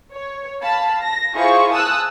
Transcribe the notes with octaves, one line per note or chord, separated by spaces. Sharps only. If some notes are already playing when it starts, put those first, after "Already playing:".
C#5
F5 A5 B5
A#6
E4 F4 G#4 C5 C#6
G#5 A5 D#6 E6 F#6